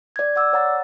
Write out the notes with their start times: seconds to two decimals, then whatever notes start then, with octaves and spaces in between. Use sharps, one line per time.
0.16 D5 G#6
0.36 D5 F#5 D6 E6
0.53 C#5 F#5 A#5 A6